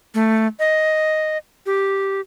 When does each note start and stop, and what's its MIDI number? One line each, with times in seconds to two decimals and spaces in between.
0.14 0.47 57
0.60 1.38 75
1.66 2.21 67